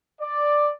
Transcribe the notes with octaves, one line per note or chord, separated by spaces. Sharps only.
D5